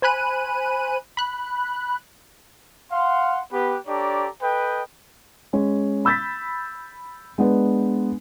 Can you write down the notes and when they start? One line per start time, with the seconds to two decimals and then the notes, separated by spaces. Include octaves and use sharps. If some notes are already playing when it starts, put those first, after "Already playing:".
0.02 C5 G#5 B5 F#6 D#7
1.17 B5 F#6
2.92 F5 F#5 C6
3.52 B3 G4 B4
3.87 D4 G4 A4 C#5 D5 A#5
4.42 A4 B4 D#5 G5
5.53 G#3 C#4
6.05 B5 E6 G6 A6 B6
7.38 G#3 B3 D4 B4